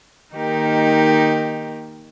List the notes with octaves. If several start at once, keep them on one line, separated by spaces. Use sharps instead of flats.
D#3 A#3 D#4 G4 A#4